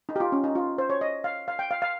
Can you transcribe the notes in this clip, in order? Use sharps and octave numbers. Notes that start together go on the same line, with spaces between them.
D#4
G4
F4
C#4
D#4
F4
C5
C#5
D#5
F5
F5
G5
F5
F5